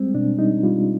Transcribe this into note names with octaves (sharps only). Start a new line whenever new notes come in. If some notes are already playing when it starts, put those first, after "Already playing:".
Already playing: G3 G#3 C4
B2 D4
G3 D#4
G3 F4